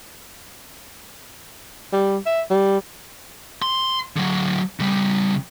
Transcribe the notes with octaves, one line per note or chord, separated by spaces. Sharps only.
G3
E5
G3
C6
D3 F#3
C#3 G3